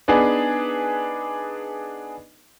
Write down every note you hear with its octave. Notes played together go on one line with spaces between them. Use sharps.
B3 D4 D#4 G#4 B4